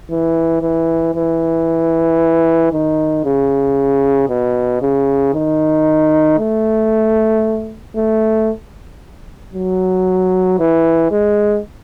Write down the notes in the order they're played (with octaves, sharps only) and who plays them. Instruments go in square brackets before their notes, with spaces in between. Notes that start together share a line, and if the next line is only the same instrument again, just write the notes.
[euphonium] E3
E3
E3
D#3
C#3
B2
C#3
D#3
A3
A3
F#3
E3
G#3